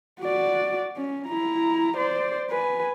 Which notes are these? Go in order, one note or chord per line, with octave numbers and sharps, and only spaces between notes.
F#4 D5
C#4
E4 A#5
C5 D5
B4 G#5